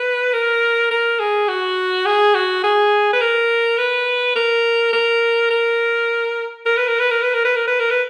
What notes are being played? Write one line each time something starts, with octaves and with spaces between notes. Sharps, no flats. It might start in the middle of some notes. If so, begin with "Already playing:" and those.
Already playing: B4
A#4
A#4
G#4
F#4
G#4
F#4
G#4
B4
A#4
B4
A#4
A#4
A#4
A#4
B4
A#4
B4
A#4
B4
A#4
B4
A#4
B4
A#4
B4